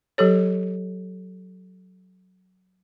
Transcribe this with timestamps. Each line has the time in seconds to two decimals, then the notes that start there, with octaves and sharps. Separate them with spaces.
0.18 F#3 G4 A4 C#5